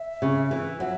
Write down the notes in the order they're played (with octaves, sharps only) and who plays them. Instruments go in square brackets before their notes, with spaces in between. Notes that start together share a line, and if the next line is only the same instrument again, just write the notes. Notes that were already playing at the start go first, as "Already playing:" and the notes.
Already playing: [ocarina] E5
[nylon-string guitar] C#3
E3
F#3